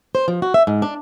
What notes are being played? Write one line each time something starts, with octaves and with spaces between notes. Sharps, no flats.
C5
F3
F#4
E5
G#2
D4